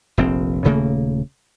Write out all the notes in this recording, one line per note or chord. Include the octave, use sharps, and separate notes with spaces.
F1 A#1 C4
D#1 C#3 A3 A#3